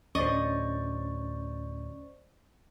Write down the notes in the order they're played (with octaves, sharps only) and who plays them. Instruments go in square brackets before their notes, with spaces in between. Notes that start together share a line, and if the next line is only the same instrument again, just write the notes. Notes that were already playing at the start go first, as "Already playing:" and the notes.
[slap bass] D2 A2 [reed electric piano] C#4 [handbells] C5 D5 C#6 [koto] D#5